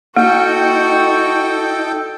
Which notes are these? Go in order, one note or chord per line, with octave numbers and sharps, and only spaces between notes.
A#3 D#4 E4 F#4 A4 D#5 G5